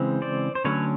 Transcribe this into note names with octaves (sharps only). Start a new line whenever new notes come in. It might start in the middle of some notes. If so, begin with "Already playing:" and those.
Already playing: C#3 E3 G#3 C4
C5 D5
C5
D3 F#3 A3 C#4 B4 C#5